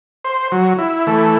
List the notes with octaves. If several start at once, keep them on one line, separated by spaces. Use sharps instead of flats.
C5
F#3
E4
E3 A3